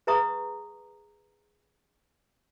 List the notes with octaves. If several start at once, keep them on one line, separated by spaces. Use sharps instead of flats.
G#4 B4 E5 A#5 C#6 D#6